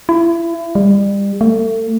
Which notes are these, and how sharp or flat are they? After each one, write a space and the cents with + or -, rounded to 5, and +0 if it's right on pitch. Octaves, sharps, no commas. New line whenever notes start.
E4 +30
G3 +30
A3 +35